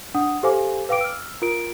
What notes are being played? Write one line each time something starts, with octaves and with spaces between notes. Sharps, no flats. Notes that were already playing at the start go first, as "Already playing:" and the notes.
D4 F#5 D#6
G4 A4 C5 F5 G#5 D6
B4 F5 G5 D6 D7
E6 F6
F4 A#4 D7